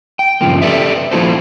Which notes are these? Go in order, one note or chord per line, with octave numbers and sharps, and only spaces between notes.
G5
G2 C#3 F3 A#3
G4 A4 B4 D5 E5
F3 A#3 E4 F#4 A4 C5